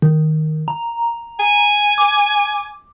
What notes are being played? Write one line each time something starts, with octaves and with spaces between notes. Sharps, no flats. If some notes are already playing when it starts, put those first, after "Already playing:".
D#3
A#5
G#5
D6